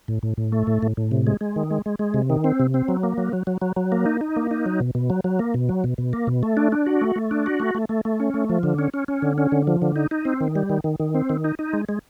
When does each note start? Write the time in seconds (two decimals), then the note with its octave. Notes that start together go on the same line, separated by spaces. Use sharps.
0.08 A2
0.23 A2
0.37 A2
0.52 A3
0.67 A2
0.83 A2
0.97 A2
1.11 C3
1.27 G#3
1.41 G#3
1.56 D#3
1.71 G#3
1.86 G#3
1.99 G#3
2.14 C3
2.30 D#3
2.44 C4
2.60 C3
2.74 C4
2.88 F#3
3.03 A#3
3.18 F#3
3.33 F#3
3.47 F#3
3.62 F#3
3.76 F#3
3.92 A#3
4.06 D#4
4.21 D#4
4.36 A#3
4.51 D#4
4.66 F#3
4.80 B2
4.95 B2
5.10 F#3
5.24 F#3
5.39 A#3
5.54 B2
5.69 F#3
5.84 B2
5.98 B2
6.13 A#3
6.27 B2
6.43 A3
6.57 D4
6.72 D4
6.86 F#4
7.01 A3
7.16 A3
7.31 D4
7.46 F#4
7.60 A3
7.75 A3
7.89 A3
8.05 A3
8.20 C#4
8.34 A3
8.49 F3
8.63 D3
8.79 C#4
8.94 C#4
9.08 C#4
9.22 D3
9.38 C#4
9.52 D3
9.67 F3
9.82 D3
9.96 D#4
10.11 D#4
10.25 C4
10.41 D#3
10.56 G3
10.70 D#3
10.84 D#3
11.00 D#3
11.14 C4
11.29 D#3
11.44 D#4
11.59 D#4
11.73 G#3
11.89 G#3